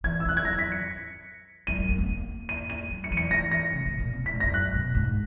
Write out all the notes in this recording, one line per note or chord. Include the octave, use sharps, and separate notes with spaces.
E3 G#6
E6
E3 F#6
G#6
F#3 A#6
B6
C#7
F#3 D#7
A#3
A#3
B3
A#3
D#7
D#7
F#3
C#7
E3 D#7
C#7
E3 A#6
A#6
C#3
B2
A#2
B2
A#2 B6
G#2
F#2 A#6
F#2 F#6
B2
G#2